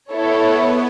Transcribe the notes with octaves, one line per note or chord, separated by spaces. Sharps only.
B3 E4 A4 C#5